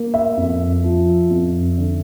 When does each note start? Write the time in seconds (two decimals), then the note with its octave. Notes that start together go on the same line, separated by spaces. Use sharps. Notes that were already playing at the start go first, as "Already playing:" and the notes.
Already playing: A#3
0.14 E5
0.37 F2
0.84 F3
1.30 F2
1.78 D3